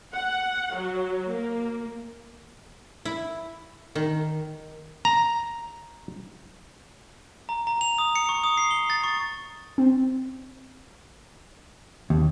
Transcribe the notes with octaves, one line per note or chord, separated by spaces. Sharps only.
F#5
F#3
A#3
E4
D#3
A#5
A#5
A#5
F7
D#6
C#7
C#6
D#6
C7
G7
A6
C#6
C4
D#2